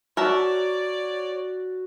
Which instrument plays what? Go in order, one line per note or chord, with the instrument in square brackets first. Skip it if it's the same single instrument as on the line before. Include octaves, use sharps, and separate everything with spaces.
[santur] F#4 [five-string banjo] A#4 E5 A5 [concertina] C#5 [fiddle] D5